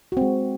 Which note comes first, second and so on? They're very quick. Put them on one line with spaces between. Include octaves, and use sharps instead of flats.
F#4 C4 G#3